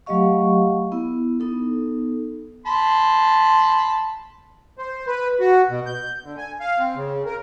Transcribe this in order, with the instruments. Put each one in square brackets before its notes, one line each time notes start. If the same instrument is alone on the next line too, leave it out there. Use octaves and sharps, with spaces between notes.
[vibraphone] F#3 A3 G4 D#5 F5 C#6
B3 E4
B3 D#4 A4
[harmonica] A5 B5 C6
[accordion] C5
B4
F#4
B2
G6
D3
G#5
F5
C4
C#3
A#4